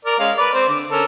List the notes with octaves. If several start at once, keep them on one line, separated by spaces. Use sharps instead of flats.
A#4 D5
G#3 C#4 F5
B4 D5
C4 C5
D3 D6
C#4 A4 A#4